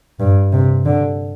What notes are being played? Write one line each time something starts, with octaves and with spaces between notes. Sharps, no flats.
G2
C3
D3